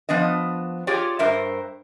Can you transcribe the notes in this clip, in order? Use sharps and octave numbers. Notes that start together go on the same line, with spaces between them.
F3 B3 D4 D#5
F4 G4 G#4 C#5 D5
G2 A#4 C5 E5